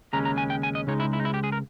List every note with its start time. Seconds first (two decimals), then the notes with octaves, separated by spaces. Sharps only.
0.13 D#2 C#3 G#3 C#4 A#5
0.25 A#5
0.38 G#5
0.50 G5
0.63 G#5
0.75 D#5
0.87 C#2 C#3 G#3 D#4 C#5
1.00 E4
1.13 E4
1.20 D#4
1.25 E4
1.34 G4
1.44 G#4
1.52 A#4